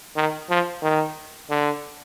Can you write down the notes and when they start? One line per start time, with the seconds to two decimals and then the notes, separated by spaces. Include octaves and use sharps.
0.16 D#3
0.49 F3
0.82 D#3
1.50 D3